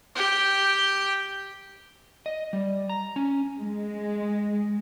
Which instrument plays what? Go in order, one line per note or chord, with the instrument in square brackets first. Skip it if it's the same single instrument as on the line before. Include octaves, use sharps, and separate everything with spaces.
[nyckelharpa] G4 G5
[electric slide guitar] D#5
G3
A#5
C#4
[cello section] G#3